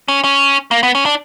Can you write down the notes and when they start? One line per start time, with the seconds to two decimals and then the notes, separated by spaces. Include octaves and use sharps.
0.08 C#4
0.24 C#4
0.71 A#3
0.83 B3
0.95 C#4
1.06 D4